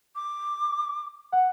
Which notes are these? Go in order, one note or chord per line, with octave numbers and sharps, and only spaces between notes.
D6
F#5